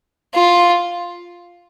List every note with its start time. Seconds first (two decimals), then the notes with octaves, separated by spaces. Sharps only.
0.34 F4